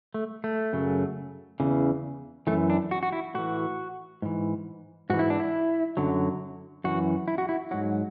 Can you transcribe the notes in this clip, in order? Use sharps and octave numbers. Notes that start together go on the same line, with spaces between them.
A3
A3
F#2 C#3 F#3
E2 C#3 E3
F#2 E3 A3
D4
F#4
F#4
E4
A2 E3 F#4
G#2 E3
G#2 E3 F#4
E4
D4
E4
F#2 D3 F#3
F#2 E3 F#4
E4
F#4
E4
G#2 F#3 F#4